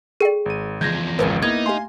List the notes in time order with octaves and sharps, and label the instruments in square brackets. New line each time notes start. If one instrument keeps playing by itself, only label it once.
[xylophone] G#4 G5 [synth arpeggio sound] A4 D5
[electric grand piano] G#1 D#7
[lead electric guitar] E2 F3 [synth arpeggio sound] C#3 G#3 [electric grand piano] G6 G#6 A#6
[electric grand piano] G#1 C#2 [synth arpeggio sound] A#4 B4 G#5
[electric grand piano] A#3 B3 E4 [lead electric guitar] D#4 [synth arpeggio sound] D6 [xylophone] G#6
[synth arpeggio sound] A3 G4 [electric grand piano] F5 G#5 C6